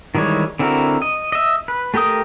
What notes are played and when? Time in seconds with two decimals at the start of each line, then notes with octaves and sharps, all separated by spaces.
0.15 D#3 E3 G3 G#3 C#5
0.59 D3 C4 E4 F#4 A#4
1.02 D#5
1.32 D#5 E5
1.68 B4
1.94 A3 G4 A#4 G5 D#6